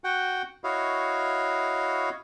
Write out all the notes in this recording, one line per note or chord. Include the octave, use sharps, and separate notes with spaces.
F#4 F#5 G5
E4 F#4 C#5 D#5 F5